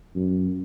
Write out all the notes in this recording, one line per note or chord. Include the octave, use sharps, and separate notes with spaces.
F#2